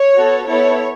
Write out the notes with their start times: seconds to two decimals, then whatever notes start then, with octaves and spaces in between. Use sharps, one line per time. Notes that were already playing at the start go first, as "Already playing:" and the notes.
Already playing: C#5
0.15 B3 F#4 A4
0.47 B3 E4 A4 C#5